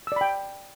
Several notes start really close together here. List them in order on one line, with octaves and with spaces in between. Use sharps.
E6 D5 B5 G5